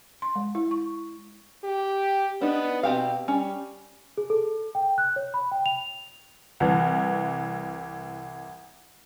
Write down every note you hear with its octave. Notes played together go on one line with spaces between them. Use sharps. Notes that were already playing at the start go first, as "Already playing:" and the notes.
C6
G#3
E4
C#6
G4
B3 D4 D#4
B2 C4 G4 F5
G3 C#4
G#4
A4
G5
F#6
C#5
B5
G5
F7
C2 E3